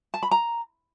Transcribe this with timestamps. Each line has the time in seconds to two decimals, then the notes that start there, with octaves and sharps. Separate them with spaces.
0.14 A5
0.23 B5
0.31 A#5